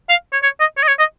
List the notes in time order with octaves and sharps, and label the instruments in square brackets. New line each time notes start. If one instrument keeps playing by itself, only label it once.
[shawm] F5
C#5
C#5
D#5
C#5
D#5
C#5
D#5